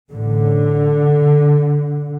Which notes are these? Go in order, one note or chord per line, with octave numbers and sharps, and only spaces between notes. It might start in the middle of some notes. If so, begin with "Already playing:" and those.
A1 A2 D3